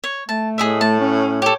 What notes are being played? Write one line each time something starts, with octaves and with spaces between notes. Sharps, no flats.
C#5
A3 A5
A2 G#4 D#5 E5
A3 A5
C#4
G4 A4 C#5